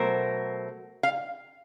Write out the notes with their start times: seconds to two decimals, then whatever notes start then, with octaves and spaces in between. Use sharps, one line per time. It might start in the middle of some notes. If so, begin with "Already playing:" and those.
Already playing: B2 F#3 A3 A#4 C5
1.03 F5